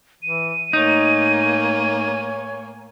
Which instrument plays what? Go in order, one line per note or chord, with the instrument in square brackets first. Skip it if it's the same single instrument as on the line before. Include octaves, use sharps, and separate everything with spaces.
[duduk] E3 [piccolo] D#7
[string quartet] A2 A#3 G#5 [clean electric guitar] D#4 [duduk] C#5